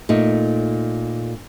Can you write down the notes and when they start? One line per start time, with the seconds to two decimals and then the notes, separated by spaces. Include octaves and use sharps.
0.09 A#2 A3 D#4